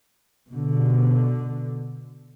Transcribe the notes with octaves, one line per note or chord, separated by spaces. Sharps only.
B2 D3